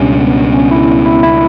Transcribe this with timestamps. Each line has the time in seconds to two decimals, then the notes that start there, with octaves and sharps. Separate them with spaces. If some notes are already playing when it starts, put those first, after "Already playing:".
Already playing: C#2 B2 G3 C#4 D4
0.20 B3
0.54 C#4
0.71 E4
1.06 E4
1.23 E4